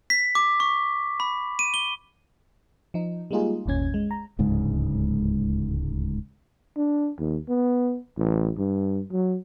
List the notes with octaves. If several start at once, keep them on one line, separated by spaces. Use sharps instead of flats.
B6
D6
C#6
B5
D#7
G7
F3 D#4
G3 G#3 A#3 D#4 F4 G#4
G1 D#2 A#2 C#4 G#6
G#3
A#5
D1 C#2 G#2
D4
D#2
B3
A1
G2
F#3